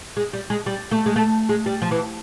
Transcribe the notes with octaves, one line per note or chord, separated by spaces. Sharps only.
G#3
G3
G#3
G3
A3
G#3
A3
G#3
G3
F3
E3